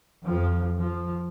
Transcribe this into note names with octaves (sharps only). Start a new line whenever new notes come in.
F2 F3
F3